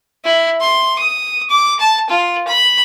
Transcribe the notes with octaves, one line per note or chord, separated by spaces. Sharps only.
E4
C6
D#6
D6
A5
F4
B5